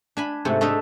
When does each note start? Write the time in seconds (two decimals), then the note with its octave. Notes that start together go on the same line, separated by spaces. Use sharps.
0.17 D4 G#5 B5
0.45 G#2 C3 A3 F#5
0.61 A3 D4 D#4 D#5 E5